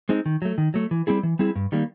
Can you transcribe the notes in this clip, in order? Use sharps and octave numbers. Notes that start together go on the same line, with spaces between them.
G#3 C4 D#4
D#3
F#3 A3
D#3
F#3 A3
E3
G3 C4 E4 G#4
E3
G3 C4 E4 G#4
G2
D#3 G3 A#3